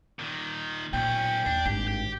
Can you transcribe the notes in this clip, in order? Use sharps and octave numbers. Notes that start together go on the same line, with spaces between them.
A#2 D#3
B1 A#2 C#4 G5
D#2 D4
G#1 G2 G4
G4